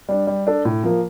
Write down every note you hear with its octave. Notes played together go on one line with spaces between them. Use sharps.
G3 D4
G3
D4 A4
A2
F3 A#3